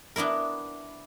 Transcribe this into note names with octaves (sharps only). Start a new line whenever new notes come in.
B3 D4 E4 A#4